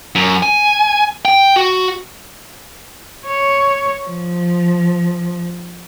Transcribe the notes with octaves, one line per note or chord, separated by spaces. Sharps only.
F#2
G#5
G5
F#4
C#5
F3